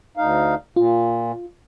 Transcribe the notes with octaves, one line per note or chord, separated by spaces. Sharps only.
D2 D#4 F5
A#2 F4